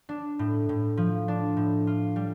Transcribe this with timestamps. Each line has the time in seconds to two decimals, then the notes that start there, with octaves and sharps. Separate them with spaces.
0.09 D4
0.39 A2
0.69 A2
0.97 F3
1.28 D4
1.57 A2
1.87 F4
2.16 G3